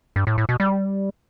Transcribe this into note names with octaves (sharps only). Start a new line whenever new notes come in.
G2
A2
A2
B2
G3